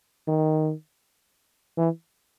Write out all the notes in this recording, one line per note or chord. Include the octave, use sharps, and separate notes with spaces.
D#3
E3